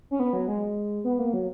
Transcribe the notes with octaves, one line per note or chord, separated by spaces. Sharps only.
C#4
B3
F#3
G#3
B3
A#3
F#3